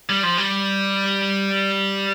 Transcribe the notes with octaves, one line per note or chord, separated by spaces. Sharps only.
G3
F3
G3